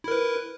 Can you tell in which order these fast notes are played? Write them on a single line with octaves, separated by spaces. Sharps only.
E4 A#4 B4